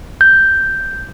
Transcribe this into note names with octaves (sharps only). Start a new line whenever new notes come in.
G6